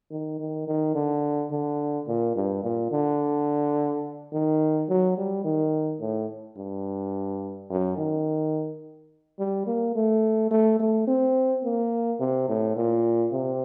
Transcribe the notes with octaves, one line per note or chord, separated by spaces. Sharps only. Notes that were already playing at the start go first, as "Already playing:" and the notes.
D#3
D#3
D#3
D3
D3
A#2
G2
A#2
D3
D#3
F#3
G3
D#3
A2
G2
F#2
D#3
G3
A#3
A3
A3
A3
C4
A#3
C3
A2
A#2
C3